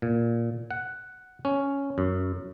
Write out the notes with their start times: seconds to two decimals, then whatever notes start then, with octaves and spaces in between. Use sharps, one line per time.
0.02 A#2
0.71 F#5
1.45 C#4
1.98 F#2